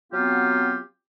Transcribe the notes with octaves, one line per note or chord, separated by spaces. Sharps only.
F#3 B3 C4 F4 G4